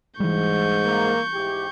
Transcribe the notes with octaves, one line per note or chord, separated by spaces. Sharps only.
G#2 E3 G3 C#6 G6
A#3
G#2 E4 G4